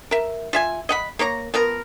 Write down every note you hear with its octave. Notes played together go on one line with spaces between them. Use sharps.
A#4 E5
F4 E5 G#5
D#5 F#5 B5
A#3 A#4 C#5 A#5
F3 B3 A#4